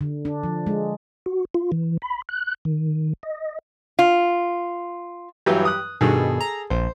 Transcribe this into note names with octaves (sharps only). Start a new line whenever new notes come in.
D3
D4
F3
G#3
F#4
F4
E3
B5
F#6
D#3
D#5
F4
G2 E3 F#3 G4
D#6 F#6
G2 B2 D#3 G#4 A4
A#5
A#1 C5